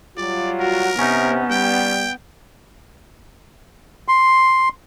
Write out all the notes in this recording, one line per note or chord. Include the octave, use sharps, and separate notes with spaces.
F#3 G3 F4 D5
F#4 A#4
C3 B3 C#4 D#4
G3 G5
C6